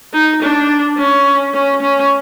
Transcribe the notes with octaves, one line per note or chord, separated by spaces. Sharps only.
D#4
D4
C#4
C#4
C#4